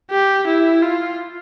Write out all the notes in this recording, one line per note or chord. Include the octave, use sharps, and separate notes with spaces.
G4
E4
F4